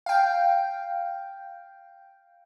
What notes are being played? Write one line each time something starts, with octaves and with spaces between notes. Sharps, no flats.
F5 G5